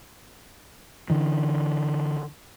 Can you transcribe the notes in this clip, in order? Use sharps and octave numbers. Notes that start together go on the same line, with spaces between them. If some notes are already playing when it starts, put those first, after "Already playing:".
D3 E3